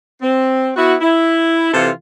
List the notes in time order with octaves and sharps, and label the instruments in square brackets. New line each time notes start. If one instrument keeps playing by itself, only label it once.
[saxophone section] C4
B3 E4 F#4
E4
C3 E3 F4 A4